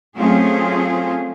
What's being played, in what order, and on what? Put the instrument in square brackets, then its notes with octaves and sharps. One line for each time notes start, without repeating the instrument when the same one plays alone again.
[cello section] F#3 A3 C4 C#4 F4 G#4